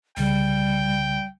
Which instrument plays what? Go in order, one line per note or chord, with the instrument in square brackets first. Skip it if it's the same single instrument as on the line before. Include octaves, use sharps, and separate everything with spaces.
[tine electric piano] C2 C#3 [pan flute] G3 [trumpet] G5